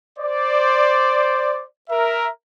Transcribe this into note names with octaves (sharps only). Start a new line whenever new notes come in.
C5 D5
A#4 E5